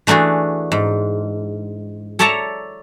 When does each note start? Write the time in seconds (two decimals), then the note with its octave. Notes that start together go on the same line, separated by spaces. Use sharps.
0.07 E3 A3 D4 F#4 G#4
0.72 G#2
2.19 A4 C#5 D5 E5 A5 A#5